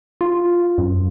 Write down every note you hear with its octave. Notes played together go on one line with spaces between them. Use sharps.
F4
F#2